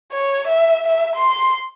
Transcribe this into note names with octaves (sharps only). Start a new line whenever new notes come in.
C#5
E5
E5
C6